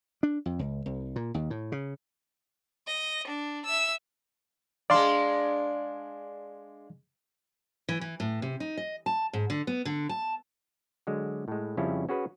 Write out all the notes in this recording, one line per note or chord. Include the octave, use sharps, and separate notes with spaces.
D4
F2
C#2
C2
A#2
D#2
A2
C#3
D#5
D4
E5 E6
G#3 D4 D5 F5 C6
E3
E3
A2
C3
D#4
D#5
A5
G#2
D3
B3
D3
A5
D3 F#3 G#3
A2 G#3
F2 C#3 G3 C#4 E4
C#4 F#4 G#4 B4